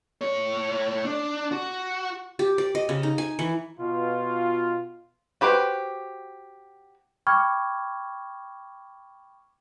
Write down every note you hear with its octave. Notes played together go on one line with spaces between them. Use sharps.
A2 C#5
D4
F#4
G4
D5
D#5
C#3
D#4
G#5
E3
B2 F4
F#4 G4 B4 C5 G5
G5 B5 C#6 D6 F6 G#6